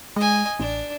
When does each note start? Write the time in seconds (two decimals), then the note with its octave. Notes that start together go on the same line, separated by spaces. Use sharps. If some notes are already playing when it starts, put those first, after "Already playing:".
0.16 G#3 D#5 G#5
0.59 A1 D4